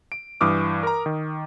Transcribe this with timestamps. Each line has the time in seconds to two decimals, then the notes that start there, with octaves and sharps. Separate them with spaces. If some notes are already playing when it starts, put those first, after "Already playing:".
0.12 D7
0.41 G2 E3 D6 D#6 F6
0.83 A#4 A#5
1.06 D#3